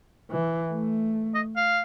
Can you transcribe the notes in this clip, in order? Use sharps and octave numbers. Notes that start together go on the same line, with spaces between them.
E3
A3
D#5
F5